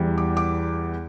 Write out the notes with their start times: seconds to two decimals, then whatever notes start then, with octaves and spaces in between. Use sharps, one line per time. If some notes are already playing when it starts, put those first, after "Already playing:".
Already playing: E2 E3 G3
0.18 D6
0.37 D6